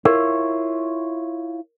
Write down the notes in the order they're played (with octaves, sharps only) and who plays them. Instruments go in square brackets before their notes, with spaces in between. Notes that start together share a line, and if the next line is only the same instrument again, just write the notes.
[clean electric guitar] E4 F4 C#5 [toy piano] A#4